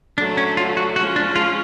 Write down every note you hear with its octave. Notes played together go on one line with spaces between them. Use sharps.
D3 F#3 A3 D4
C#4
F4
F#4
F3 G#3 C#4 F#4
D4
F4